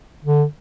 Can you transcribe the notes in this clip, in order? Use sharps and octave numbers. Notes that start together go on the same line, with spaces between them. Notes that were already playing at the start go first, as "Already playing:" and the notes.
D3